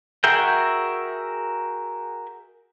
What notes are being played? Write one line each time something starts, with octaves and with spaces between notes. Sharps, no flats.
F#4 G#4 A#4 E5 G5